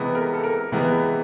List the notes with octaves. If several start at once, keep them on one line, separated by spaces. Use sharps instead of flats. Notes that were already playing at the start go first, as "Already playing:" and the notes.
Already playing: C3 E3 G#3 B3
A#4
A4
A#4
C3 E3 G#3 B3